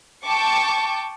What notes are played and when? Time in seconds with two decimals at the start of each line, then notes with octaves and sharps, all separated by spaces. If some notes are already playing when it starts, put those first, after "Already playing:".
0.25 G5 A5 C#6 D6